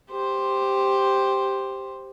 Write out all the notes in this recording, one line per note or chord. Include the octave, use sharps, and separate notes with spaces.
G4 C5